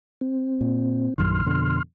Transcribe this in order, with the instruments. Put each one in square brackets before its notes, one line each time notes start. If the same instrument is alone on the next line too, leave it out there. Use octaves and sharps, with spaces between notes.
[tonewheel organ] C4
[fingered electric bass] A#2
[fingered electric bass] A#1 F#2 D#3 [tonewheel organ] C6 F6
[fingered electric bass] F2 B2 D3